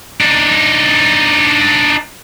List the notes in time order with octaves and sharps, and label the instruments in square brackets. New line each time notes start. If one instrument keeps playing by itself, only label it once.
[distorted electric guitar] D4 D#4